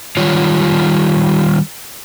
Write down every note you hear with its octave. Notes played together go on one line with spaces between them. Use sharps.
D#3 G3 F4 C#5